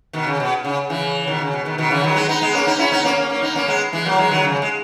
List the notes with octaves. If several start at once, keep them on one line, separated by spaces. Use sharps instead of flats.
B2 D#3
C#3
B2
C#3
C#3 E3
B2 D#3
C#3
B2
B2 D#3
B2 D#3
C#3 E3
D#3 F#3
G#3 B3
B3 D#4
G#3 B3
A#3 C#4
B3 D#4
C#4 E4
B3 D#4
A#3 C#4
A#3 C#4
A#3 C#4
B3 D#4
A#3 C#4
G#3 B3
E3 G#3
F#3 A#3
E3 G#3
D#3 F#3
C#3
G#3